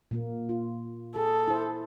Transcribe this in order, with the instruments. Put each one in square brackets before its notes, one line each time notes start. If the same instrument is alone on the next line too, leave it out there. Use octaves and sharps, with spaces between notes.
[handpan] A#2 A#3
F4
[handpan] G#4 [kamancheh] A4
[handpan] E4 C5